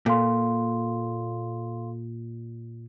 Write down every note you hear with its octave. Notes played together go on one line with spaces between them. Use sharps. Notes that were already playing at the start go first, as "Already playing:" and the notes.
A#2 A4 F5 C6